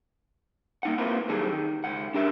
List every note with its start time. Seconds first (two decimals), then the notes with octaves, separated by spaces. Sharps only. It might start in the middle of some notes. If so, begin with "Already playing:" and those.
0.83 A#3 D#4 F#5
0.98 A#3 C4 E4 F4 A#4 B4
1.29 F#2 D#3 G3 G#4 A4
1.52 D#3
1.84 C#2 F#5
2.14 D4 G4 A#4 E5